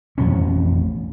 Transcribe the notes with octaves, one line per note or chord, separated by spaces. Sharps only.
A1 F2 B2 C#4